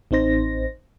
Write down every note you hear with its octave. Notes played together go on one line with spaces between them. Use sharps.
A1 C4 D#4 C5 A#6